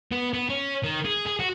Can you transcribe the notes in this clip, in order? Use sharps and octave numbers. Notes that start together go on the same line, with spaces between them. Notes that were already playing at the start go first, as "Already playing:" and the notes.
B3
B3
C#4
D#3
G#4
G#4
F#4